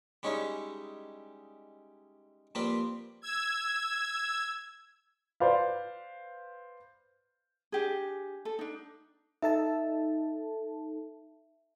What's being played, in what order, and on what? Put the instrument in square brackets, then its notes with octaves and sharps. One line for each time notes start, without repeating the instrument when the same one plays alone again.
[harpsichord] G3 G#3 C#4 D#4 E4
F3 G3 A#3 C4 B4
[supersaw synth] E6 G#6
[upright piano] B4 C5 D5 F5
[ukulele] D4 G4 G#4
A4
D4 D#4
[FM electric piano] D#4 A4 A5 [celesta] E5